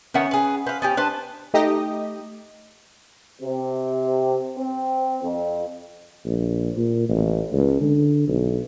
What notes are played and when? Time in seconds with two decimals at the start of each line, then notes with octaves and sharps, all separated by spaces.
0.14 D#3 B3 C#4 E5 F#5
0.31 G#4 B4
0.66 B4 C5 F5
0.82 B3 C#4 G4
0.97 D4 B4 C5 A5
1.54 A3 D#4 G4 D#5
3.42 C3
4.57 C4
5.23 F2
6.26 A#1
6.77 A#2
7.09 A1
7.53 C#2
7.81 D3
8.28 B1